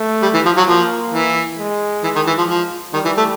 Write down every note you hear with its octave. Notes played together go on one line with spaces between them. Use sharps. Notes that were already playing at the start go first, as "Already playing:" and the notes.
Already playing: A3
G3
E3
F3
F#3
F3 A#3
E3
G#3
E3
D#3
E3
F3
F3
D#3 G3
E3
A3